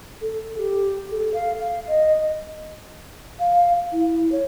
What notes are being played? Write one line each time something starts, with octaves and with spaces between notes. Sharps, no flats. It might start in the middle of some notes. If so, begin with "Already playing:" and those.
A4
G4
A4
F5
F5
D#5
F5
E4
C#5